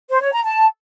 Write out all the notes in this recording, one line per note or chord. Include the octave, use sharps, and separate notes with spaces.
C5
C#5
A#5
A5